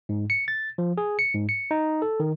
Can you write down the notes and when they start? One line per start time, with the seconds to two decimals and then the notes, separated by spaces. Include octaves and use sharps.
0.09 G#2
0.30 C#7
0.48 A6
0.78 F3
0.98 G#4
1.19 C#7
1.34 G#2
1.49 C#7
1.71 D#4
2.02 A4
2.20 D#3